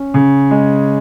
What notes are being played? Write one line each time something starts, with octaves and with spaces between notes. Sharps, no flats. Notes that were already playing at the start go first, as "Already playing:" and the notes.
Already playing: C#4
C#3
G#3